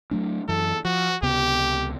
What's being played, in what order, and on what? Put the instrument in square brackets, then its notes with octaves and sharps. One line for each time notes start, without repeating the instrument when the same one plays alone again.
[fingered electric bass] F#3 A3 D4
[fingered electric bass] F#2 E3 [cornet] A4
[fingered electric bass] F3 [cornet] F#4
[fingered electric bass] C#2 C3 B3 [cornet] G4